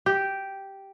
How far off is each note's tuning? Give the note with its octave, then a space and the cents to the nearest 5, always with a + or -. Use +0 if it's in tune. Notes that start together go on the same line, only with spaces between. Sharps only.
G4 -5